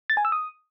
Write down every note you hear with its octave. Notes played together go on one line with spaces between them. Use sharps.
A6
G#5
E6
D#6